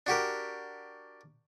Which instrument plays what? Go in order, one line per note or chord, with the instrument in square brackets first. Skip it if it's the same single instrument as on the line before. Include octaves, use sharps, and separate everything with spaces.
[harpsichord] D4 F#4 G4 A#4